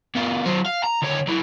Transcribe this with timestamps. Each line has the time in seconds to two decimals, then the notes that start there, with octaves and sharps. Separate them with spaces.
0.15 B2 F4
0.46 F#3 C5
0.66 F5
0.83 A#5
1.02 D2 C#5
1.27 F#3 E4